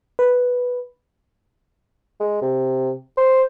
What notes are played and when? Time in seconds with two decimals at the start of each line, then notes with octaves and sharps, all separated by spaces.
0.19 B4
2.20 G#3
2.42 C3
3.18 C5